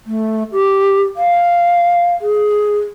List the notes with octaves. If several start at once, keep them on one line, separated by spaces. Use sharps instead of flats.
A3
G4
F5
G#4